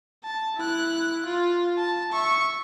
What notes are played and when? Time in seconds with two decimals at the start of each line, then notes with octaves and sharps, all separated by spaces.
0.24 A5
0.56 E4 F#6
1.26 F4
1.78 A5
2.12 E5 C#6